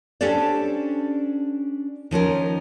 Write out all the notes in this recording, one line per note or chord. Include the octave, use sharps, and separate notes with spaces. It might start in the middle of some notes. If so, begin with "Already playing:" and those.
C#4 D4 G4 A4 C5 D5
D#3 F3 C#4 A#4